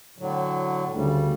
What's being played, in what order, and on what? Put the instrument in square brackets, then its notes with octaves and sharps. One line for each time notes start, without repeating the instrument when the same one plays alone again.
[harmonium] A2 D3 F#3
[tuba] D2 [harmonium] C#3 G3